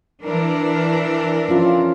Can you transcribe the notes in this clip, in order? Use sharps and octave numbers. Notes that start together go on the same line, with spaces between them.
E3 D4 A#4
F3 C#4 F4